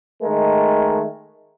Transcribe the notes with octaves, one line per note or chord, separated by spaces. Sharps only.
D#3 G#3 A3 A#4